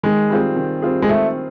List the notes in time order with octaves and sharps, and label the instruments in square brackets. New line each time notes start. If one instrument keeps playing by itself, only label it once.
[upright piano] D#3 [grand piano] G#3
[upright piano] G3 C4 F4 G#4
D#3
G3 C4 F4 G#4
[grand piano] G#3
[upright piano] D#3 [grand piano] A3